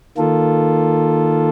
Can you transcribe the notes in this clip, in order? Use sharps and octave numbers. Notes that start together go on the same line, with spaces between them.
D#3 A#3 F4 A4